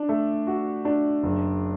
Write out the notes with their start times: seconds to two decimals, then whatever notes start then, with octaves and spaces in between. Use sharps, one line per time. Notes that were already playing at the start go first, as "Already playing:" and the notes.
Already playing: D4
0.09 A3
0.47 F#4
0.85 D4
1.23 F#1